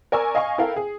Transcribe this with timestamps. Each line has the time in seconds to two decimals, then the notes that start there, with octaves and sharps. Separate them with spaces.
0.12 A#4 D5 G#5 C#6 E6
0.35 D#5 F5 G#5 C#6
0.58 E4 A4 A#4 F5 G5
0.76 G#4